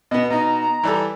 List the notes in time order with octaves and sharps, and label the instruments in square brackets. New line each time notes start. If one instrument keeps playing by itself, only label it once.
[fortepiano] B2 B3 [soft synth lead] D#5
[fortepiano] B2 D#4 [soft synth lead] A#5
[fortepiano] E3 G3 A4